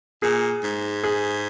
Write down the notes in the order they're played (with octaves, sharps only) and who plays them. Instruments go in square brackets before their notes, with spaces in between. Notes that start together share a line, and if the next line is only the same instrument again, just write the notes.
[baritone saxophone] A#2 [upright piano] G#4
[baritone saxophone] G#2
[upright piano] G#4